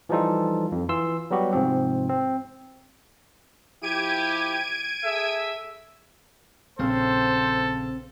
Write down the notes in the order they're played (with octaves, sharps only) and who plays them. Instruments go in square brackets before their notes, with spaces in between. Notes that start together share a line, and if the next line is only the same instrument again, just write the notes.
[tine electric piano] E3 F3 G3 D#4 F4 A4
F2
E3 F4 C6 E6
F#3 G3 B3 F#4 G4
G#2 C3 F3 C4
C4
[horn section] F3 E4 G4 [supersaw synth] G#6 D7 D#7
[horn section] G#4 A4 E5
[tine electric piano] A#1 C#3 F5 [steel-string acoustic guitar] C4 [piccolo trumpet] A4 [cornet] C5